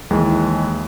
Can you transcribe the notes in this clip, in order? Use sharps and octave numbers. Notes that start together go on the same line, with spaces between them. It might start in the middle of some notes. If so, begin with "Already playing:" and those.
D#2 E3 G#3